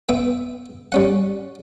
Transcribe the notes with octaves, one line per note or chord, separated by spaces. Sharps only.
B3 E5 G5
G3 C#4 F#5